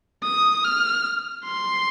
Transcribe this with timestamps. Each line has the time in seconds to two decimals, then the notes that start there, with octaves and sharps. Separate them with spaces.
0.24 D#6
0.65 F6
1.45 C6